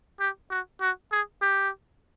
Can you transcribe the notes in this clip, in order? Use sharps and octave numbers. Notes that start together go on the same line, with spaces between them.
G4
F#4
F#4
G#4
G4